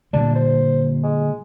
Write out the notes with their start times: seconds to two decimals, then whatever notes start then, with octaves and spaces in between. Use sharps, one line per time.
0.13 A#2 D3 G3 D4
0.35 C5
1.03 G#3